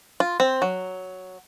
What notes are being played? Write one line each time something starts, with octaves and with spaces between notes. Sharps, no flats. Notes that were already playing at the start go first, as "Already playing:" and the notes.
F4
C4
F#3